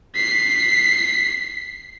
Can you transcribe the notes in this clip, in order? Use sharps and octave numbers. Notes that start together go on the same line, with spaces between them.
B6 C7